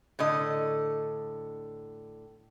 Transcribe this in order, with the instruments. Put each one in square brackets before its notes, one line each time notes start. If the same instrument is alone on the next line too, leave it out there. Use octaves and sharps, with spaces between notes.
[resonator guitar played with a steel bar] A2 D3 D#5